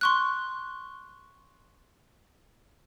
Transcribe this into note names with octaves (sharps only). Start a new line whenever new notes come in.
C6 C#6 F#6